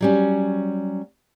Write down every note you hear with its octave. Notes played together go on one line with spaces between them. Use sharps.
F#3 G3 C#4